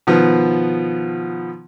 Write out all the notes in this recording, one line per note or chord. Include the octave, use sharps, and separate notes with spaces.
B2 D#3 F3 B3